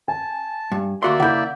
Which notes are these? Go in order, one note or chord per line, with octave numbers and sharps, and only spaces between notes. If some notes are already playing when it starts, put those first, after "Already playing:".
G#5 A5
G2
D2 A#3 F#4 D5 E5 C6
C#3 E4 F#5 G6